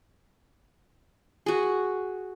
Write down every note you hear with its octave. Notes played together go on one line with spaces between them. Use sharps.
F#4 G#4